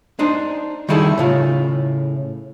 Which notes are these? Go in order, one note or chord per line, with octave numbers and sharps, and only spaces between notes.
D4 D#4 C5
D#3 G3 D#4 E4 G#4 A4
A2 C#3 F4